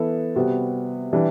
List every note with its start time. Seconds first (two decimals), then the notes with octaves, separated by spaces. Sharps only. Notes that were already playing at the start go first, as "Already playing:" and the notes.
Already playing: E3 B3 E4 A4
0.35 C3 G3 B3 F#4
1.13 E3 G3 D4